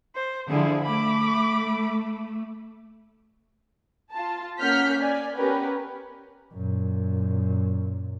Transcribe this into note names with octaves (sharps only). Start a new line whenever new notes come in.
C5
D3 F3 E4 G#4
A3 B5 D6
F4 A5
A#3 C#4 F#5 F6 G6 B6
D5 G#5
B3 C#4 G4 A#4 B4
F#2 A#2